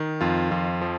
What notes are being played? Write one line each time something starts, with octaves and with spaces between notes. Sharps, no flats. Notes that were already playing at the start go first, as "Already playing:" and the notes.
Already playing: D#3
F2 F4
F2 F4
F3